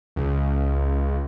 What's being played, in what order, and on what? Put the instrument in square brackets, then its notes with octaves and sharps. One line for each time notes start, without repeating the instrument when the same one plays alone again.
[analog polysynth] C#2